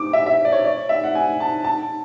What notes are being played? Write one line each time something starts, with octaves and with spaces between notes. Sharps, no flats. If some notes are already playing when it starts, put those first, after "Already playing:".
Already playing: D6
E5
E5
D5
C#5
D5
E5
F#5
G#5
A5
A5